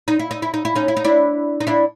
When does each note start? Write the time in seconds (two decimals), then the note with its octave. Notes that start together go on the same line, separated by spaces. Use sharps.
0.08 D#4
0.19 E4
0.31 D#4
0.42 E4
0.54 D#4
0.65 E4
0.75 C#4 D#4
0.88 E4
0.97 D#4
1.04 D4 E4
1.60 D#4
1.67 D4 E4